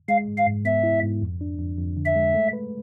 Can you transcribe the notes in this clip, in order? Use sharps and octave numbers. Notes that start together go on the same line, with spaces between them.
G#3 F5
G#2
F5
G#2
B3 E5
E4
G#2
F2
D4
F2
F2
D3
E5
G#3
A3
B4